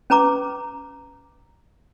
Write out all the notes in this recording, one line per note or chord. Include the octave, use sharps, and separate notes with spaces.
C#4 B4 A#5 D6